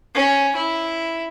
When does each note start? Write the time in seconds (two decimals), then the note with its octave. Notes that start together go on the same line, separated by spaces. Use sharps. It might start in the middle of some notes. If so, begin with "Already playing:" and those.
0.15 C#4
0.56 E4